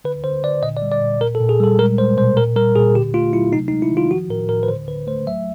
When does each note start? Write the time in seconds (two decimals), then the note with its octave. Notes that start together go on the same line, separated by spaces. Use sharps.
0.05 D3 B4
0.24 D3 C5
0.43 D3 D5
0.62 A#2 D#5
0.77 D5
0.82 G3
0.92 D5
1.01 A#2
1.20 A#2 A#4
1.35 A4
1.41 A#2
1.49 G#4
1.60 G3 A4
1.79 G#3 A#4
1.98 G#3 C5
2.17 B2 C5
2.37 A#2 A#4
2.56 G3 A#4
2.76 A#2 G#4
2.95 D3 G4
3.14 A3 F4
3.33 F#3 E4
3.53 C3 D#4
3.68 D#4
3.72 G#3
3.82 E4
3.92 D#3
3.97 F4
4.10 F3 F#4
4.30 A2 A#4
4.49 A2 A#4
4.63 B4
4.68 D3 C5
4.88 D3 B4
5.07 A3 C5
5.26 F#3 E5